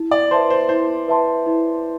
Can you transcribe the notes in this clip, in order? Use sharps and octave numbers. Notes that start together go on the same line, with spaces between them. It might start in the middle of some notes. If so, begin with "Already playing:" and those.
Already playing: E4
D5
B4 C5 E5 A5 C6
C5
E4 C5
B4 E5 A5 C6
E4